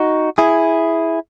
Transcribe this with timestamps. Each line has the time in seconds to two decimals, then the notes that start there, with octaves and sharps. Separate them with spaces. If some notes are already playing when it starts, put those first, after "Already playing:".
Already playing: D#4 F#4
0.38 E4 G#4